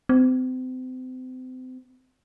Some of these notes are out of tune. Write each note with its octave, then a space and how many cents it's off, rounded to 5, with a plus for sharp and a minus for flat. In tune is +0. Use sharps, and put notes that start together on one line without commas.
C4 -35